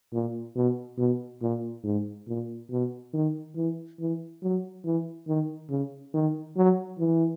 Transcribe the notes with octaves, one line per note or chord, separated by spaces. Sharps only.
A#2
B2
B2
A#2
G#2
A#2
B2
D#3
E3
E3
F#3
E3
D#3
C#3
D#3
F#3
E3